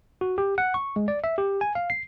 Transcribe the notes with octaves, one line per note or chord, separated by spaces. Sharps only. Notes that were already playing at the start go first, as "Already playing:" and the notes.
F#4
G4
F#5
C#6
G#3
D5
E5
G4
G#5
F5
C7